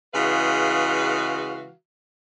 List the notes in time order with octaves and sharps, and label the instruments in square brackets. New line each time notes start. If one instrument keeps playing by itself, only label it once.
[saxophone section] C#3 E3 G#3 F#4 B4 F5